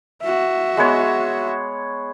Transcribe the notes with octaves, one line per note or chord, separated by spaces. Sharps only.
F#4 E5
G#3 B3 C#5